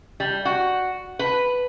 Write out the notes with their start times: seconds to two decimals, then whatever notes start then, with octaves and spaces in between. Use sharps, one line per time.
0.20 G3
0.45 F#4
1.19 B4